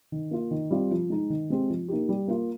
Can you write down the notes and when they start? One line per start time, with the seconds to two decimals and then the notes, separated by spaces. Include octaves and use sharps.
0.12 D#3
0.31 A#3 F4
0.51 D#3
0.71 G3 C4 F4
0.91 F3
1.10 G#3 D#4
1.30 D#3
1.50 G#3 C4 G4
1.70 F3
1.88 A#3 D#4 G4
2.09 G3
2.28 A#3 F4